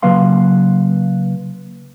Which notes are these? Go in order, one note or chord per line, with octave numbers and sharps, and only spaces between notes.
C#3 F#3 A#3 B4 F5 C6